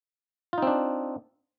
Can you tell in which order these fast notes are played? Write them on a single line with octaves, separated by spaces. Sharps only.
F4 D#4 C4 D4